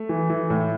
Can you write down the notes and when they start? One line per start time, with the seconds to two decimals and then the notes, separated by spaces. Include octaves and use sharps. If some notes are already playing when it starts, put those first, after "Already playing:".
Already playing: A3
0.09 E3
0.30 E3
0.50 A2